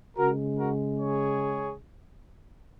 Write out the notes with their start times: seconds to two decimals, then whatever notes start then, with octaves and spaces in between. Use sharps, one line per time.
0.18 C#3 G#3 F#4 A#4
0.58 F#4 A#4
1.00 G#4 C#5